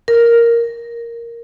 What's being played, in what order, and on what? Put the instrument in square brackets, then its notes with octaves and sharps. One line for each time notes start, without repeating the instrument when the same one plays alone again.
[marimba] A#4